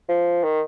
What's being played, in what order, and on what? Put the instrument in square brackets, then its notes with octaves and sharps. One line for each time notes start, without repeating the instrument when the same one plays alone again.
[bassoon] F3
D#3